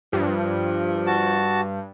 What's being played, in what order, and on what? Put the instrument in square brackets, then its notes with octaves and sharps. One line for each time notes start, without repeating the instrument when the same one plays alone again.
[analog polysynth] G2 [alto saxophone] F3
[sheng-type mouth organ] F#4 A5